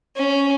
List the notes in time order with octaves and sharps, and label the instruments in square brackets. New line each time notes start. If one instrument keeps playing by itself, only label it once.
[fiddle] C#4